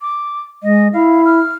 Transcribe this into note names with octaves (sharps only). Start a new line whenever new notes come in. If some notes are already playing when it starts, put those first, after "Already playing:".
D6
G#3 D#5
E4 F5
F6